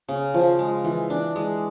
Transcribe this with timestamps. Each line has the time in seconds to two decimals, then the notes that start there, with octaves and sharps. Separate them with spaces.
0.09 C#3
0.34 F3
0.59 G#3
0.84 E3
1.10 D4
1.36 G#3